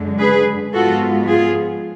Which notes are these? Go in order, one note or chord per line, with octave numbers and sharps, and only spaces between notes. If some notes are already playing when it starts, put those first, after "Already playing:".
Already playing: F#2 D3 G#3
G#4 B4
G#2 F3 G#3 B3 F4 F#4 A4
F4 G#4